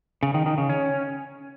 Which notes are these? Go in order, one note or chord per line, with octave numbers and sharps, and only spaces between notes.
C#3
D#3
D#3
C#3
C#4